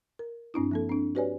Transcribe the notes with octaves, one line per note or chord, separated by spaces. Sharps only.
A#4
G2 C4 D4 E4
F3 A#3 A4
C4 D4
F#4 G4 B4 C#5 D5 G#5